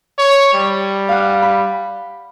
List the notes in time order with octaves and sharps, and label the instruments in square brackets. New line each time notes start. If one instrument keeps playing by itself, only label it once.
[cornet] C#5
G3
[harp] F5 F#5
B5